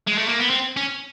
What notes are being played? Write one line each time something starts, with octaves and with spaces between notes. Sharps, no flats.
G#3
A3
A#3
B3
C4
C#4